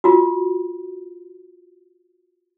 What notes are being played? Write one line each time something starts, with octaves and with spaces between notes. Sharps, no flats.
F4 F#4